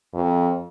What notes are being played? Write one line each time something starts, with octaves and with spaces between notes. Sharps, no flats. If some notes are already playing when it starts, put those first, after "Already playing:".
F2